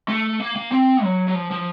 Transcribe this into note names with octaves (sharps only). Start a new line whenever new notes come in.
A3
A#3
A#3
C4
F#3
F#3
F3
F3